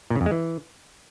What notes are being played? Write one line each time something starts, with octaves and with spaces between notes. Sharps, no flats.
A#2
C#3
F2
G#3
E3